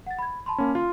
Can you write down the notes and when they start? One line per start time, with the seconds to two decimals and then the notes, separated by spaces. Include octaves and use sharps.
0.06 F#5 A6
0.19 B5 G#6
0.46 A5 B5 C6
0.58 A#3 C#4
0.75 F4 C6